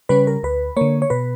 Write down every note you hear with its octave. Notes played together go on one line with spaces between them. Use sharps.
C#3 G3 C#4 B4
A#4
D2 B4
D3 A#3 C#5
C#5
B2 B4